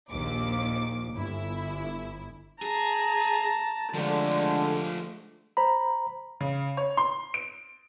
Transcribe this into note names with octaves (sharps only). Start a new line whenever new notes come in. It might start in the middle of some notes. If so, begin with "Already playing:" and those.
A#1 D#2 D6
G1 E4
G#4 A5 A#5
D3 F3 G#3 A3
C5 A#5 B5
C#3
C#5
C6
D7